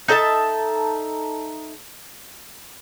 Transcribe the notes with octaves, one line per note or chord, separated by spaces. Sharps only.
D#4 A4 E5 A5